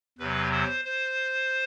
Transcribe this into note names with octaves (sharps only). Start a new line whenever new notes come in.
E2 C3 F#3 B4
C5
C5